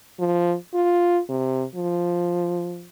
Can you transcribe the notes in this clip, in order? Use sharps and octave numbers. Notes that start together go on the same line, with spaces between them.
F3
F4
C3
F3